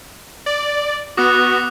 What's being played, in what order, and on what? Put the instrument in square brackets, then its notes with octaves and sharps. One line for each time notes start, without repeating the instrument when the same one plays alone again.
[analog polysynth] D5
[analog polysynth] B3 F#4 [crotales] D6 D#6 F#6